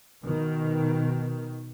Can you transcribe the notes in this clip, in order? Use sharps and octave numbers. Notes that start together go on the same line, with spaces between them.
B2 D#3